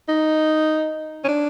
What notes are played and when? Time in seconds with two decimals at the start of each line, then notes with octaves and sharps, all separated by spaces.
0.09 D#4
1.24 C#4
1.28 D4